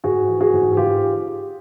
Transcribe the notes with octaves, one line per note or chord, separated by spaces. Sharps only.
G#2 F#4 G#4
E3
F#4 G#4
G#2
G#4
G#2 F4 G4